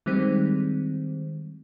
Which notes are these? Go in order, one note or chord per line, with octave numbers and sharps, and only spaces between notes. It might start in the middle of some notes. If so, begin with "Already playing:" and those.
D#3 G3 G#3 C4